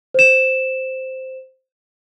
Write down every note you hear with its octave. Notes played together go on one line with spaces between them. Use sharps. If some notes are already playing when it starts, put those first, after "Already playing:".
C5 E7